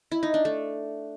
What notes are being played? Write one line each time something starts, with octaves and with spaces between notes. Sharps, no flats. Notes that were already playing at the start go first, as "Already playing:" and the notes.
E4
D#4
D4
A3